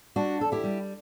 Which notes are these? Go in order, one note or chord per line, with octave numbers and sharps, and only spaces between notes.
G3 D4 F#4
E2 A4
E4 G4
G3